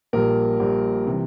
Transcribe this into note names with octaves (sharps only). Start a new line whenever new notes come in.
A#1 A#2 G3 A#4
A#1 A#2 G3
C3 E3 G3